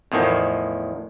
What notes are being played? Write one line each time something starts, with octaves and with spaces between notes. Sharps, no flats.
E2 A2 D#3 F3